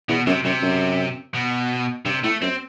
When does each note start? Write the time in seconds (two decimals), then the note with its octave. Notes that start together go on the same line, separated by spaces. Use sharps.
0.09 E2 B2
0.26 F#2 C3
0.45 F#2 C3
0.63 F#2
1.35 B2
2.05 G2 C3
2.24 A2 A3
2.42 F#2 C4